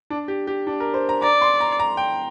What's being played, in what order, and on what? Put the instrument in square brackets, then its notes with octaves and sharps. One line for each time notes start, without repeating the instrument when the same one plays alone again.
[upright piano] D4
G4
G4
D4
A#4
C5
A#5
[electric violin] D5 [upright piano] A#5
[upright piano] C6
A#5
A#5
G5